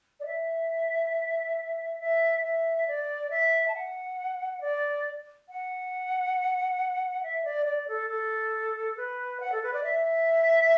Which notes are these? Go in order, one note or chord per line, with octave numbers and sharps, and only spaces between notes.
D5
E5
E5
E5
D5
E5
A5
F#5
D5
F#5
E5
D5
D5
A4
A4
B4
F#5
A4
B4
D5
E5